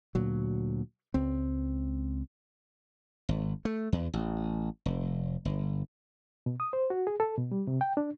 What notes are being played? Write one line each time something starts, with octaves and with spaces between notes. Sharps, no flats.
D2 A#2 F#3
C#2 C4
G#1
A3
E2
A1
F1
G1
B2
D#6
C5
F#4
G#4
A4
B2
G3
C3
G5
D4